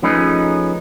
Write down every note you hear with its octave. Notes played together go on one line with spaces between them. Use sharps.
F3 A3 C#4 D#4 G#4 B4